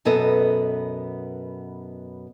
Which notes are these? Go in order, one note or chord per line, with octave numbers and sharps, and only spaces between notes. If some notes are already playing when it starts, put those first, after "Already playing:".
F#2 B2 B3 A4 D#5